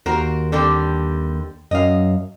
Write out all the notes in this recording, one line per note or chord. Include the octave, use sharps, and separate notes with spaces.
D#2 F#4 A#4 C5
D3 G3 C4
F#2 D#5 F5